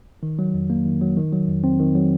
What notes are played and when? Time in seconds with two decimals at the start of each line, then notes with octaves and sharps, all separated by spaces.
0.23 D#3
0.39 F#3
0.54 F2
0.70 A#3
0.86 D#3
1.01 F#3
1.17 D#3
1.32 F#3
1.48 F2
1.64 C4
1.79 D#3
1.95 F#3